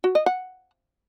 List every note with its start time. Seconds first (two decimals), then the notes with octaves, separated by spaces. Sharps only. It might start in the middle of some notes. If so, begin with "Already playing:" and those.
0.04 F#4
0.15 D#5
0.26 F#5